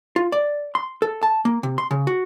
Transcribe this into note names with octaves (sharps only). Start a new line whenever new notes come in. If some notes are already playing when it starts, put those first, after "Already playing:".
F4
D5
C6
A4
A5
A#3
C3
C6
C#3
F#4